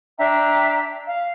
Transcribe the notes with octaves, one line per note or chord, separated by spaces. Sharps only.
D4 E5 G5 A#5
F5